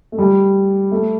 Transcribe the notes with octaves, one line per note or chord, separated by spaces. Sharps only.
A3
G3
A3